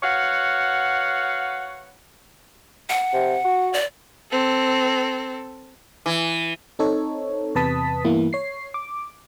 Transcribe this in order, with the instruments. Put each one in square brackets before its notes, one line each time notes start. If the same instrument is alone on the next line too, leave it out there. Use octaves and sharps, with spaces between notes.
[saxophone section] F#4 B4 C#5 F5 F#5
[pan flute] F#5
[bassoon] C3
F#4
[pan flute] D5
[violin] C4 A4
[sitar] E3
[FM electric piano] C4 D#4 A4 C#5
E2 C3 B4 A5 D#6 B6
G2 E3 A#3 B3 E4
C#5 C7
D6